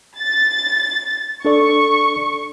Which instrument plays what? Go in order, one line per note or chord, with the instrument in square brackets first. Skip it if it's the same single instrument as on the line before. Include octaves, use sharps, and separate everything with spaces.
[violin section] A6
[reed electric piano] D4 A4 D5 [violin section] C#6